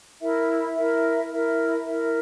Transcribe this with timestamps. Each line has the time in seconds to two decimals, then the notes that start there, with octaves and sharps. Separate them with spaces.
0.21 E4 A#4 E5
0.76 E4 A#4 E5
1.30 E4 A#4 E5
1.85 E4 A#4 E5